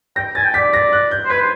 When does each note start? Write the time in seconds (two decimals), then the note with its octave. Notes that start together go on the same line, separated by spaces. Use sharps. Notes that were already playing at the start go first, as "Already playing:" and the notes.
0.16 G5 A#6
0.35 G#5 A6
0.45 G5
0.54 D5 B6
0.74 A#6
0.92 F#6
1.11 G6
1.25 C5
1.30 B4 G#6
1.40 C5